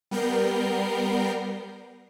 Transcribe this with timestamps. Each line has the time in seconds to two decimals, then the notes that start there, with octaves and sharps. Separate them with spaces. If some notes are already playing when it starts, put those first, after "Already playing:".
0.11 G3 B3 A#4 G6 A#6 C7